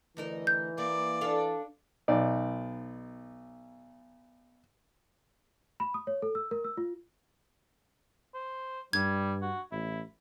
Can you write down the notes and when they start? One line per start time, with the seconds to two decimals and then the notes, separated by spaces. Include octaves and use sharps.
0.17 D2 E3 D#4 A#4
0.47 G6
0.78 A#3 D5
1.21 D4 A4 F5
2.08 B1 D#4 D5
5.80 B5
5.94 D#6
6.07 C#5
6.22 A4
6.35 E6
6.51 A#4
6.64 E6
6.77 F4
8.34 C5
8.93 G2 G3 G#6
9.42 F#4
9.72 A1 E4